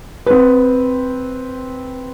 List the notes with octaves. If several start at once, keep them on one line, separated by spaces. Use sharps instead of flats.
C4 B4